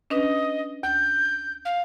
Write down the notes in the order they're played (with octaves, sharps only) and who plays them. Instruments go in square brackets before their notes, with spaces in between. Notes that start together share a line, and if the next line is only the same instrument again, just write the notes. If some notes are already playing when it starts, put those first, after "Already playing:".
[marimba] C#4 D4 B4 [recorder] D#5
[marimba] D2 [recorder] G6
[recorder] F5